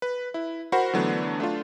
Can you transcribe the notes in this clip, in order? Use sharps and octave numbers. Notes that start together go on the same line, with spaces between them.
B4
E4
F#4 A#4 C5 F#5 B5
D3 E3 F#3 A3 B3 D4
A3 D4 F4